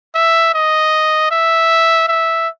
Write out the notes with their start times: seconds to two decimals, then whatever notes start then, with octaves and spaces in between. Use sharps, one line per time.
0.15 E5
0.54 D#5
1.31 E5
2.08 E5